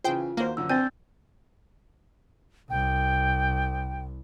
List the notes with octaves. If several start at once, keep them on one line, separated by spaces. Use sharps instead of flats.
C#3 E3 F4 G#4 C5 G5
D#2 A#3 F#4 C5
F#2 D3 F3 E6
C4 D4 C5 G5 G6 A6
C2 G5